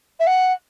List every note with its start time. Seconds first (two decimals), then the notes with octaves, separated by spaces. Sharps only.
0.20 E5
0.27 F#5